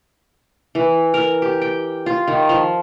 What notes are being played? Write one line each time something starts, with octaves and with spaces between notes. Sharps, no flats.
E3
A#4
G4
G5
F4
D#3
F3